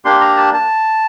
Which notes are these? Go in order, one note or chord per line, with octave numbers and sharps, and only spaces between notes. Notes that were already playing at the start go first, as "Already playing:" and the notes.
A#3 D4 G4 C6
A#5
A5
A5